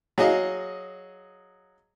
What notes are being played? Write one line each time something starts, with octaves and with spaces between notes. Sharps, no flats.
F#3 G#4 D#5 F5